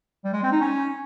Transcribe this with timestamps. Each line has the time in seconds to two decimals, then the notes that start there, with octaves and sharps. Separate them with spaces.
0.24 G3
0.33 G#3
0.43 C4
0.52 D#4
0.61 C#4